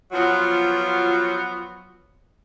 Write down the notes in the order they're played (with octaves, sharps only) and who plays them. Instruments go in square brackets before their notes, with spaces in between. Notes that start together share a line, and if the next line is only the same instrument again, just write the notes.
[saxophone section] F3 F#3 B3 F4 F#4